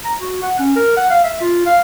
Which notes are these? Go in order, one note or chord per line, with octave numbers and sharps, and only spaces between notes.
A#5
F#4
F#5
C#4
A#4
F#5
F5
E5
F4
F5